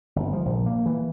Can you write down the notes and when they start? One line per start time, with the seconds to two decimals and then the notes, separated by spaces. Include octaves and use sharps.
0.16 G1
0.33 F3
0.45 A#1
0.66 A#3
0.86 E3